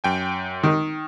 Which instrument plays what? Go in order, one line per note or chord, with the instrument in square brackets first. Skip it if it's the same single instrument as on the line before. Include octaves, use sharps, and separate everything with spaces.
[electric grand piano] F#2 G5 G#5
[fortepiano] D#3